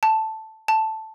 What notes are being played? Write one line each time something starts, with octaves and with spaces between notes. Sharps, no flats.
A5
A5